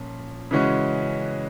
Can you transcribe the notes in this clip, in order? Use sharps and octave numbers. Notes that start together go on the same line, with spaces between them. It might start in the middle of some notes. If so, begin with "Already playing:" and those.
Already playing: A#2 F3 C#4
C#3 E3 G#3 C#4 F#4